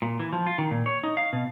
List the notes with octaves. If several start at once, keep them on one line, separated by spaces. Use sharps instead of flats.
A#2
E3
F3
F4
D#3
A#2
C#5
D#4
F5
B2